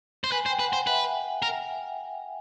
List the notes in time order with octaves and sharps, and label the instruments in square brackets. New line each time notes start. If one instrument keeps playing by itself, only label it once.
[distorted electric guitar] C5
[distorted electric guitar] B4 [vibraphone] G#5
[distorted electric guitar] C5
[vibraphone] G5
[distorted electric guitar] B4
[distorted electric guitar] C5 [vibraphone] F#5
[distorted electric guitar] B4 [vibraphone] E5
[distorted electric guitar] A#4